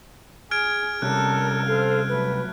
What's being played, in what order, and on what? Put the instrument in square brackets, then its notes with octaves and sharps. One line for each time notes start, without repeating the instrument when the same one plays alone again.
[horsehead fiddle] G#4 [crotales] F6 G#6 D7
[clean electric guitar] C3 G3 C#4 [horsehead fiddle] A4 A#4 [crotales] F#6
[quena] A4 [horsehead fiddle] C5 F5
[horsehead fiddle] F#3 A3 [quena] B4